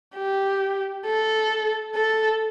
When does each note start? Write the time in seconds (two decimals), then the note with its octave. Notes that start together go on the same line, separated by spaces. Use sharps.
0.16 G4
1.06 A4
1.95 A4